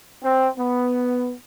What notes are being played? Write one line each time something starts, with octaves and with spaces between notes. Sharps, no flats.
C4
B3